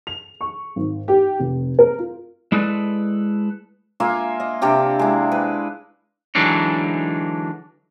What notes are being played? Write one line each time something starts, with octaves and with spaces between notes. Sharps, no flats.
F7
C#6
G#1
G4
F1
A#4
F4
G#3 E4 G#4 A4 B4 D5
A#3 F4 E5 G#5
D#5
C3 D4 G4 G5
G#3 E4
B4
D3 E3 F#3 G#3 D4 D#4